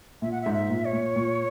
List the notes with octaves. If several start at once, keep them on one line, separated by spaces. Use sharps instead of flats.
A#2 E5
F#5
E5
G#2
E5
A#2
C#5
A#2
A#2